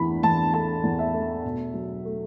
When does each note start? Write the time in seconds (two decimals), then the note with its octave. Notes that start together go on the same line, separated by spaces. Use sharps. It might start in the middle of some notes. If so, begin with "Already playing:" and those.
Already playing: E2 E3 B5
0.23 E2 A5
0.53 A3 A5
0.83 E2
0.99 E5
1.14 A3
1.45 B2
1.74 F#3
2.05 A3